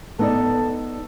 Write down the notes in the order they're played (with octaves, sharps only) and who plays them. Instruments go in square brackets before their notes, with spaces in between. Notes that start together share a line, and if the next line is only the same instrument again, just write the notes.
[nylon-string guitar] B3 D#4 D5 [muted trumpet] A4